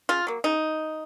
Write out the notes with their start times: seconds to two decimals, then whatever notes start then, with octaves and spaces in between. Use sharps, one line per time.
0.09 C#3 F4
0.27 F#3 A#3
0.44 C#3 D#4